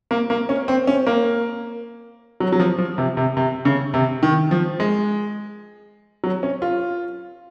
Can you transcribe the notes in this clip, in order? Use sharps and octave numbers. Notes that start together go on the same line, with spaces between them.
A#3
A#3
C#4
C4
C#4
A#3
F#3
F#3
F3
F3
C3
C3
C3
C#3
C3
D#3
F3
G#3
F#3
C#4
F4